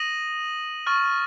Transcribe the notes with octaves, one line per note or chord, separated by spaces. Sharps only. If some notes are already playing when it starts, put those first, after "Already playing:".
Already playing: D#6 A#6 D#7 F#7
C#6 F6 A6